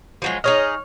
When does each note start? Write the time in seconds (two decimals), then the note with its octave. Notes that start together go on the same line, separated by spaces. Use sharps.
0.22 F3 F#3 G#3
0.44 D#4 G#4 C#5 D#5 F6